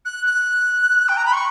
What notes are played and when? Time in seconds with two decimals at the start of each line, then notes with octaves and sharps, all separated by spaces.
0.05 F#6
0.26 F#6
1.09 G5
1.17 A#5
1.26 B5
1.33 C#6